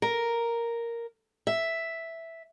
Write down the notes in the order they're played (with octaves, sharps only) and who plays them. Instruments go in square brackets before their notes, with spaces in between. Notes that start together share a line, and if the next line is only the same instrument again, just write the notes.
[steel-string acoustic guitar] A#4
E5